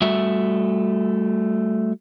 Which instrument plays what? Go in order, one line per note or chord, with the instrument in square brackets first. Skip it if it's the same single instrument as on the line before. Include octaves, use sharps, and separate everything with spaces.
[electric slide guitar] G3 A3 F#4 E5